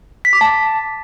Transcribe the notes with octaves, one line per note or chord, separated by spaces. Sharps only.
B6
D6
A5